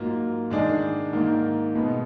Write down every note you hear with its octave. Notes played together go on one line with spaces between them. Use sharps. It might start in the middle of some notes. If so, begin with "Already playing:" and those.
Already playing: G#2 F#3 A#3 F4
G#2 D#3 G#3 D4 G#4
G#2 D#3 A#3
B2 G#3 B3